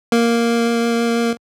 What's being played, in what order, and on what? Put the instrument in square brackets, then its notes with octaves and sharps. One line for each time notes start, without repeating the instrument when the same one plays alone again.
[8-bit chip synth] A#3